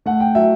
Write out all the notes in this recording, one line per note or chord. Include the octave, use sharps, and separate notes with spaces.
A3 F#5
G5
F#3 E5